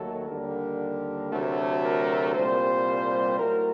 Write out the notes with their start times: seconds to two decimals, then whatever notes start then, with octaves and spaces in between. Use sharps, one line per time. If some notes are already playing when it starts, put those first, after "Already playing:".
Already playing: D#2 D#3 F#3 A3 A4
0.28 D#2 D3 G3 A#4
1.31 D2 C3 F#3 A3
1.83 A#4
2.35 C2 A#2 G3 C5
3.39 A2 F#3 A3 A#4